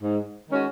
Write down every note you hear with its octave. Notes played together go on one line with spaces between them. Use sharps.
G#2
D#3 G#3 C#4 F#4